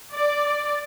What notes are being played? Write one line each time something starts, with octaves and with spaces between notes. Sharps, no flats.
D5